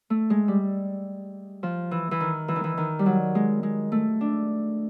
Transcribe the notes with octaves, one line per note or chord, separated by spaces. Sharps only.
A3
G#3
G3
F3
E3
E3
D#3
E3
D#3
E3
D#3
G3
F#3
G#3
G#3
A3
D4